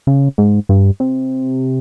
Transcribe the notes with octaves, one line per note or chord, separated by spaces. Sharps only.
C#3
G#2
G2
C3